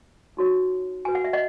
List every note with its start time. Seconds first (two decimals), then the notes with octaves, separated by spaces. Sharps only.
0.37 D#4 F#4 C#5
1.05 F#4 B4 G#5
1.15 F#5
1.24 E5
1.33 D#5 F#5